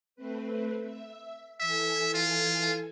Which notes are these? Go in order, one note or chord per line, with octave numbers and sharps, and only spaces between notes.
A3 C4 B4
E5
E3 A4 E5 G#5
F4